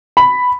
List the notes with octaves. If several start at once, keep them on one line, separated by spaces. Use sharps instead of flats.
B5